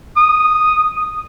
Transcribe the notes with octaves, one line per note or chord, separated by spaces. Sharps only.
D#6